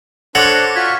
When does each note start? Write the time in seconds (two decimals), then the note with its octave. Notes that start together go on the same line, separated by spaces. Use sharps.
0.35 D4 A4 C5 C#5 F#5 D6 F#6 A#6
0.75 F4 F#4 C#6 G#6 B6